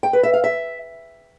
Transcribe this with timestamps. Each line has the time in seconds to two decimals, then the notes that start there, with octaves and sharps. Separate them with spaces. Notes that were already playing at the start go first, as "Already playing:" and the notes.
0.03 G5
0.13 B4
0.23 E5
0.34 F5
0.44 E5